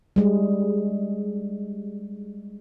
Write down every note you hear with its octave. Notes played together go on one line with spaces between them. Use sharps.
G3 G#3